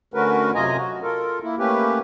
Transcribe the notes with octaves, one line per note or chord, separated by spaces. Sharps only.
D3 A3 C#4 F#4 A#4 B4
F#2 C3 F4 D#5 G#5 A#5
F#4
F4 A4 A#4
A#3 E4
A3 A#3 C#4 G4 B4